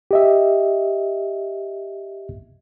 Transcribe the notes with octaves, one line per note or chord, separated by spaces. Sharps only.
G4 D#5 E5